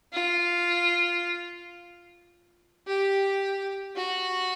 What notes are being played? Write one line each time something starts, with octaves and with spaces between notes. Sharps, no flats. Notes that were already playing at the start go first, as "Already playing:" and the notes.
F4
G4
F#4